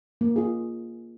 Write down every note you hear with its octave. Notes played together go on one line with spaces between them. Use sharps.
A#3
F4 G#4